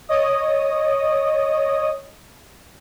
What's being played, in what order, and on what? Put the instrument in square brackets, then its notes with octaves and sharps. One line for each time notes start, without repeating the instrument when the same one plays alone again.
[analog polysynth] C#5 D#5 D#6